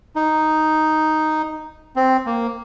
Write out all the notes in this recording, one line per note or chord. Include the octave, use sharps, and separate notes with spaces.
D#4
C4
A#3